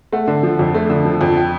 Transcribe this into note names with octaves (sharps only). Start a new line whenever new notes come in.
A3 F#5
D3
F3
F2
A3
D3
F3
F2
G5